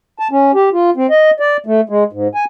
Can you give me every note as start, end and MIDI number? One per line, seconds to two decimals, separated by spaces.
0.19 0.28 81
0.31 0.52 61
0.55 0.69 67
0.73 0.90 65
0.97 1.07 60
1.10 1.31 75
1.40 1.57 74
1.66 1.81 57
1.89 2.04 56
2.13 2.28 44
2.35 2.45 80